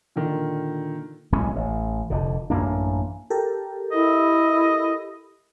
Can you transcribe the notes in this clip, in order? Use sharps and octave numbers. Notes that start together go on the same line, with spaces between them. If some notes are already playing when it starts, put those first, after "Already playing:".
A#2 D3 D#3
D1 B1 G#3 C#4
A1
F1 D3
A1 F#2 A#3 D4
G4 A4 A#4
E4 D#5